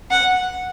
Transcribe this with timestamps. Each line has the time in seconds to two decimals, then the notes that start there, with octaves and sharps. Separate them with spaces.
0.11 F#5